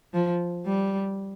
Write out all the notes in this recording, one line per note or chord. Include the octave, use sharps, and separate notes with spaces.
F3
G3